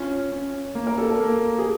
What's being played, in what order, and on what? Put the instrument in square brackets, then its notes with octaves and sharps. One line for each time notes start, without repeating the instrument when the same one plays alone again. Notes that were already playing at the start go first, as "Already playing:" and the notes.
Already playing: [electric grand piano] C#4 [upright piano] F4
[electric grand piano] C#4
A#3
[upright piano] A#4
A4
A#4
[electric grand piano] A#3
[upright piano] G#4